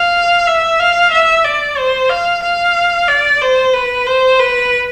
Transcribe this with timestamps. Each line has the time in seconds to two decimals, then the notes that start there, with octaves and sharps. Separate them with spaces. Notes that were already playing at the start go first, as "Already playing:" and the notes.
Already playing: F5
0.47 E5
0.80 F5
1.12 E5
1.45 D5
1.77 C5
2.10 F5
2.43 F5
3.08 D5
3.41 C5
3.73 B4
4.07 C5
4.39 B4